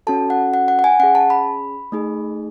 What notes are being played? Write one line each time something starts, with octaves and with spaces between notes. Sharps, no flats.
C#4 F#4 A4 A5
F#5
F#5
F#5
F#5
G#5
C#4 G#4 F#5
A5
B5
A3 D#4 G#4